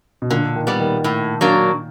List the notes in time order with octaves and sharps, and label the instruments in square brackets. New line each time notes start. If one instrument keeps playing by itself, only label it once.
[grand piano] B2
[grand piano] A#2 [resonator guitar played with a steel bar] D3
[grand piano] D#3
[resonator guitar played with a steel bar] G3 B3
[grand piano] D#3
[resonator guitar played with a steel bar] A2
F#3 A#3 D4